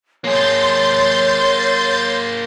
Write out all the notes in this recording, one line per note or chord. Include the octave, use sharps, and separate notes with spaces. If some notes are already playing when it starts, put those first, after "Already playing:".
A#3 G#4 C#5 C6 G6 A6